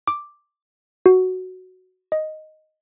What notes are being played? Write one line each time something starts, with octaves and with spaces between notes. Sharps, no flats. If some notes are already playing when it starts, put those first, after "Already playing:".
D6
F#4
D#5